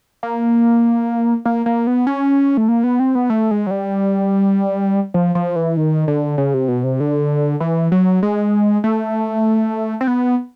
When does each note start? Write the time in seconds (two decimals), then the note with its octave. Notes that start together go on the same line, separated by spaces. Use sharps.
0.23 A#3
1.46 A#3
1.66 A#3
1.87 B3
2.07 C#4
2.57 A3
2.68 A#3
2.84 B3
3.00 C4
3.15 B3
3.30 A3
3.51 G#3
3.67 F#3
3.71 G3
5.14 F3
5.35 F3
5.56 E3
5.77 D#3
6.08 D3
6.38 C#3
6.54 C3
6.68 B2
6.84 C3
7.00 D3
7.60 E3
7.92 F#3
8.23 G#3
8.84 A3
10.01 C4
10.07 B3